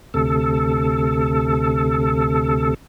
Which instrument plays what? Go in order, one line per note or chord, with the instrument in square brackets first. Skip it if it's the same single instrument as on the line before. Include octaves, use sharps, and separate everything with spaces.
[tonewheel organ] D2 C3 A4